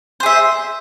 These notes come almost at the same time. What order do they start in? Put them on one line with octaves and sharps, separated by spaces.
C5 G#4 E5